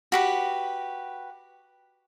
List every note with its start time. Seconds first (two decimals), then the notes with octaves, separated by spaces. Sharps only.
0.12 F#4 G4 B4